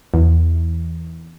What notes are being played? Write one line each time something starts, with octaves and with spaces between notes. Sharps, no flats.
E2